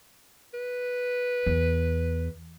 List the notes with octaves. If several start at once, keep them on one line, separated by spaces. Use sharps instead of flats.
B4
E2